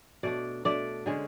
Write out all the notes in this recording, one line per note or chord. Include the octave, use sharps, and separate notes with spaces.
B2 A3 D4 D5
B2 A3 D4 D5
D3 G#3 C#4